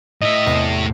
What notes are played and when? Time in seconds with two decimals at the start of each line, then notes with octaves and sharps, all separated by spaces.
0.22 A2 D#5 E5
0.46 E2 C3 C7